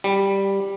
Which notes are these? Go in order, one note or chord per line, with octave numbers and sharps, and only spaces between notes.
G3